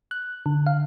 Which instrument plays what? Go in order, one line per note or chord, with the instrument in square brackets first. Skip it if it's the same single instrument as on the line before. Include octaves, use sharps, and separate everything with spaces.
[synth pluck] F#6
D3
F5